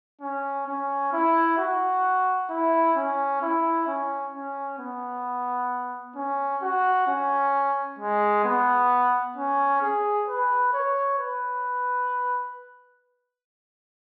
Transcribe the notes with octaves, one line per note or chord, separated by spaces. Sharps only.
C#4
C#4
E4
F#4
E4
C#4
E4
C#4
C#4
B3
C#4
F#4
C#4
G#3
B3
C#4
G#4
B4
C#5
B4